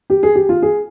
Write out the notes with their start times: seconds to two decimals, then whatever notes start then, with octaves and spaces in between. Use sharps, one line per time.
0.10 G4
0.23 G#4
0.35 G4
0.49 F4
0.62 G#4